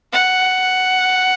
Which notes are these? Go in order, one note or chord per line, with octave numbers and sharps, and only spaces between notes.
F#5